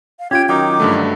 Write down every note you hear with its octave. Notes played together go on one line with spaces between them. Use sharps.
F5
C#4 F4 G4 G5 G#6
D#3 F#3 D#4 G5 D6
G2 D3 A3